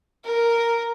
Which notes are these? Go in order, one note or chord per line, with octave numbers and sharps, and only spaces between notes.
A#4